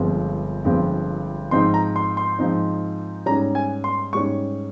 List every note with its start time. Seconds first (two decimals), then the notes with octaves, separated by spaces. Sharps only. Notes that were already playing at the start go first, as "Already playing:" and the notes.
Already playing: G1 G2 F3 G#3 C4
0.65 G1 G2 F3 G#3 C4
1.51 G#2 F3 C4 D#4 C6
1.74 A#5
1.96 C6
2.17 C6
2.39 G#2 F3 C4 D#4
3.26 G#2 G3 C#4 A#5
3.55 G#5
3.84 C6
4.13 G#2 G3 C#4 C#6